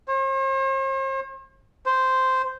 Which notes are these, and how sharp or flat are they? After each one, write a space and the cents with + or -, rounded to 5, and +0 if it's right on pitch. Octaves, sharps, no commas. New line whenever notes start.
C5 +45
C5 -5